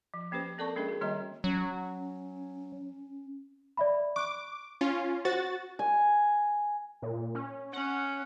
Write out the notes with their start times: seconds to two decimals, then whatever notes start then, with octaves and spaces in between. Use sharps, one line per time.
0.14 F3
0.31 F3 A#3 C#4 G4 B4 C5
0.58 C4 A4 A#4 D5 A5 C#6
0.76 G#3 A#3 C#4 D4 G#4 A#4
0.88 F#4
1.01 D#3 G3 A#3 F#4 D#5 A#5
1.44 F#3 C#4
3.77 D5 E5 B5
4.16 C#6 D6 F#6
4.81 C#4 F4
5.25 F#4 C5 A6
5.79 G#5
7.02 A#2
7.35 C#4
7.73 C#4 F#5